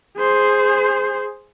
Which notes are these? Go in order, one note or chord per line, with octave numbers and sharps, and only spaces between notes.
G#4 C5